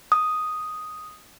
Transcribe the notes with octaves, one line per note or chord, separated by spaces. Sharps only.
D#6